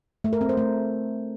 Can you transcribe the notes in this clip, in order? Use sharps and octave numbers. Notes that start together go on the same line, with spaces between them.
A3
A#4
C4
C5
A3